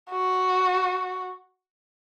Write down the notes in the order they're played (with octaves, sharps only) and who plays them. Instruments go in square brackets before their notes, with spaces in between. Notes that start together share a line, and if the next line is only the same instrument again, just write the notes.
[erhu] F#4